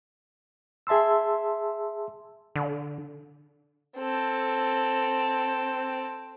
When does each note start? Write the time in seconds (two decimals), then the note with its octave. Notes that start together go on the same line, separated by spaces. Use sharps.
0.87 G#4 E5 A5 C6 E6
2.56 D3
3.97 C4 A4